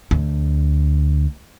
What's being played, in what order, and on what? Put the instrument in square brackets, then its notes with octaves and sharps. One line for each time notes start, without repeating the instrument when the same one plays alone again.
[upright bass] D2